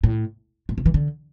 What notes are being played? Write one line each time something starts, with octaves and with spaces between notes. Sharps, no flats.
A2
A2
C3
E3
D3